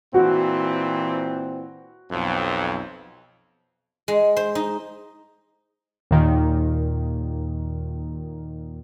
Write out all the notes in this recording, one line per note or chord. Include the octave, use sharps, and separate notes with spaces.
A#2 E3 C4 F#4
B1 F2
G#3
C5
D#4
D#2 A#2 D#3